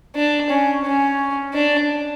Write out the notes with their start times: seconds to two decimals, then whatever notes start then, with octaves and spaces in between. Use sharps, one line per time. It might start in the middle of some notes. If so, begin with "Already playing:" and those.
0.15 D4
0.50 C#4
0.85 C#4
1.54 D4